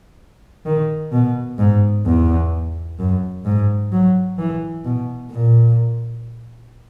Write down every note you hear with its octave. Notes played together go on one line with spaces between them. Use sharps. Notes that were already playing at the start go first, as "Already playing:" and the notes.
D#3
B2
G#2
E2
F#2
G#2
F#3
E3
B2
A#2